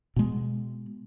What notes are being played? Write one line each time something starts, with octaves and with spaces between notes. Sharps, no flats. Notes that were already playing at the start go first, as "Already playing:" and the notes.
B2 G#3